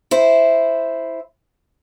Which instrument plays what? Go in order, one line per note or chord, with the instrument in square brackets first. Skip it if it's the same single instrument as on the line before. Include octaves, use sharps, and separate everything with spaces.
[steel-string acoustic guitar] E4 C5